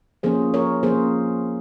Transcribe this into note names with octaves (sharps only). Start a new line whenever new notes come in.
F3 A#3 C#4 G#4 C5
A#4 C#5
F3 A#3 C#4 G#4 C5